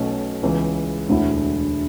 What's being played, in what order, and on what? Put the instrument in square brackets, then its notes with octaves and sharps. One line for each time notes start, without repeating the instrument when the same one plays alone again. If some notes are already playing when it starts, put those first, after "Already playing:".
Already playing: [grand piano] B1 B2 A3 C#4
C#2 C#3 E3 B3
E1 D2 D3 A3 E4